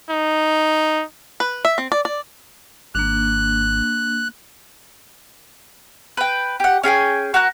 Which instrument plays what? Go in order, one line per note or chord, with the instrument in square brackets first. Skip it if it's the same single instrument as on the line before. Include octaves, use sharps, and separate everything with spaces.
[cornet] D#4
[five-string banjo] B4
E5
C4
D5
D5
[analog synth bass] G#1 [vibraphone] A#3 D4 [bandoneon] F#6
[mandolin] B4 G5
G4 F#5
C#4 G#4 G5 G#5
F#4 A#4 F#6